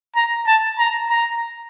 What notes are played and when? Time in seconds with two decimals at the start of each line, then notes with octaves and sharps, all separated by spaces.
0.16 A#5
0.47 A5
0.79 A#5
1.10 A#5